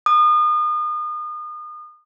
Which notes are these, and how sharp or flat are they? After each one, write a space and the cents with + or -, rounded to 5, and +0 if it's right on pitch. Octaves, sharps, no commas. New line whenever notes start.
D#6 -35